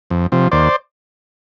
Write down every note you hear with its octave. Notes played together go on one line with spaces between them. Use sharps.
F2
C3 F3
D#2 C5 D5